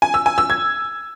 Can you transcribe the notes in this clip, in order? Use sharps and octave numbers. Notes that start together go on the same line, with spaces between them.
G#5
E6
G#5
E6
G#6